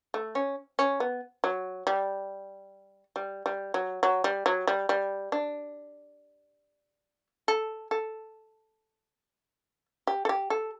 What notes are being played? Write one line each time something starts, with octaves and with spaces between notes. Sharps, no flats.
A3
C#4
C#4
B3
F#3
G3
G3
G3
F#3
F#3
G3
F#3
G3
G3
D4
A4
A4
G4
A4
G4
A4